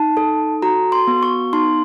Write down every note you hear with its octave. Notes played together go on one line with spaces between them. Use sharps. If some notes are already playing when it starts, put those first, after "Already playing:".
Already playing: D#4 A5
A4
F#4 A#5
C6
B3
C#6
D#4 C6